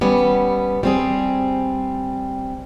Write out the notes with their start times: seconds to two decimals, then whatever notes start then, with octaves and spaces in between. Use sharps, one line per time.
0.01 G3 B3 C#4
0.83 G3 C4 G#4